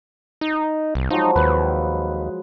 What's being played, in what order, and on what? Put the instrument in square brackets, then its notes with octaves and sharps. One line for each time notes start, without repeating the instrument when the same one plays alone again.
[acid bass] D#4
C2
[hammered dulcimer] F3 F#3 G#3 [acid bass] D#4
[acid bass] D#2 [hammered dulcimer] B4